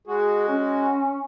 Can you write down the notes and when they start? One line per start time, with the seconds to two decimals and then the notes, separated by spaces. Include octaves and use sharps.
0.07 G#3 F#4 G#4
0.48 C#4